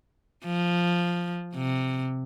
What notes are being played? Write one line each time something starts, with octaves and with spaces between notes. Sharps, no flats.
F3
C3